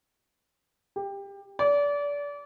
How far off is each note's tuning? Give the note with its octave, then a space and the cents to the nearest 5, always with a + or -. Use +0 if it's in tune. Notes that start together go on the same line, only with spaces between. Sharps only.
G4 +20
D5 -30